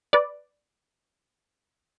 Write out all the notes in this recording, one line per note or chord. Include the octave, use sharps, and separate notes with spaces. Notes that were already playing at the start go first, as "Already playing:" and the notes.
B4 D5